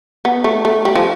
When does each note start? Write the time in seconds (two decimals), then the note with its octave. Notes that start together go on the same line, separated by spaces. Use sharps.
0.25 B3
0.44 A3
0.65 A3
0.85 G3
0.95 F3